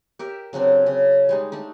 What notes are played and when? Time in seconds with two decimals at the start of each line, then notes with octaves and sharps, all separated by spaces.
0.19 G4 A#4 E5
0.53 C#3 F#3 C4 D4
0.86 C#3
1.29 G3 G#3 D#4
1.52 A3 D4 D#4